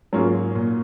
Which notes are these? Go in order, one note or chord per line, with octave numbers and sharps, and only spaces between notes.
G#2 F#3 A#3 C#4 F4 G#4
A#2